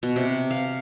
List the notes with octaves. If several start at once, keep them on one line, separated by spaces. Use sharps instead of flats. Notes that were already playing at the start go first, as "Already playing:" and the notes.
B2
C3
F5